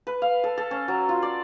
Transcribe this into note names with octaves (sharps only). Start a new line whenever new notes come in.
B4
F5
A4
A4
C#4
F#3
F4
D5